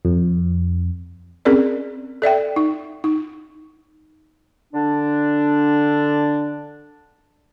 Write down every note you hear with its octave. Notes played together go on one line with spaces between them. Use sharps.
F2
C4 C#4 G#4 A#4 D5
A4 D5 E5 G5
D#4
D#4
D3 D4